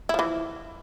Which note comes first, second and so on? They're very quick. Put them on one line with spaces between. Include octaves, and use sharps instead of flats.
E4 F3 E3